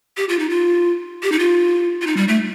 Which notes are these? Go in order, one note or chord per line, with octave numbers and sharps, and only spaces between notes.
G4
F4
D#4
F4
G4
D#4
F4
F4
D#4
G3
A3